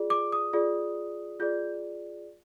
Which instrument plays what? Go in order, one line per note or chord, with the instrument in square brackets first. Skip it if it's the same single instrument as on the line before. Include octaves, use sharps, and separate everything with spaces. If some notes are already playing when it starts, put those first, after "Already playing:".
Already playing: [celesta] F4 G#4 D5
D6
D#6
F4 G#4 D5
F4 G#4 D5 G6